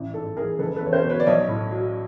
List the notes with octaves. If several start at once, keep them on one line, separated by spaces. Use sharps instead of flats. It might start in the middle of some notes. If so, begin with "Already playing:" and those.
Already playing: A1
G#2 A4
E3 G#4 A#4
F#1 A4 B4
A4 B4
E2
C#5
A#4 C5
B2
B4 C#5
D5
B1 C#5 D#5
A2
F#3